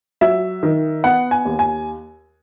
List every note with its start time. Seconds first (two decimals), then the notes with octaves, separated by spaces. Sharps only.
0.21 F#3 E5
0.63 D#3
1.04 B3 F#5
1.31 G#5
1.45 D#2
1.59 G#5